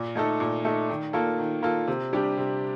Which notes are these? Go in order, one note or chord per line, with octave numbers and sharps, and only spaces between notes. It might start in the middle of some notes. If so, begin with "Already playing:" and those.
Already playing: A#2
A3 D#4 A4
A#2
A3 D#4 A4
D#3
A#3 F4 A4
D#3
A#3 F4 A4
C3
G3 D4 G4
C3